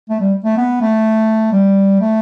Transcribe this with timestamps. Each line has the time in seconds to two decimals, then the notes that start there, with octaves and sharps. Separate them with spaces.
0.09 A3
0.20 G3
0.44 A3
0.57 B3
0.81 A3
1.53 G3
2.00 A3